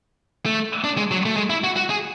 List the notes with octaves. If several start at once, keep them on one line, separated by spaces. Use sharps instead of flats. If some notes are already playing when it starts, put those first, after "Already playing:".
A3
D4
G#3
F#3
A3
G#3
E4
F#4
F#4
G#4